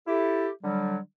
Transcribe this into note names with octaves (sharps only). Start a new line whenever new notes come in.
E4 G4 A4
D3 F#3 G3